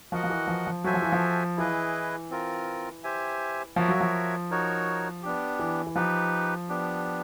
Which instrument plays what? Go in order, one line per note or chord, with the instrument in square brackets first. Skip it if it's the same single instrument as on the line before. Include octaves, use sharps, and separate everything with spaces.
[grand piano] F3 [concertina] F#4 A#4 D#5 F#5
[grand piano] F3
E3
F3
F3
[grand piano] F#3 [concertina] F#4 A4 C5 E5 G#5
[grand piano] F3
E3
F3
[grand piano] E3 [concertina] E4 G#4 B4 D#5
[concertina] C4 F4 A#4
G4 C5 E5 G#5
[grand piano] F3 [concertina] F#4 A#4 C#5 E5
[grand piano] F#3
F3
[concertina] D#4 F#4 A#4 C#5
B3 D4 G4
[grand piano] E3
E3
[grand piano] F3 [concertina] D#4 G4 B4
[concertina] B3 D4 G4